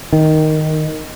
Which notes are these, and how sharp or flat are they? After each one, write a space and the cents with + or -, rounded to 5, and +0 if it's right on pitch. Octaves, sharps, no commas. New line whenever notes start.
D#3 +0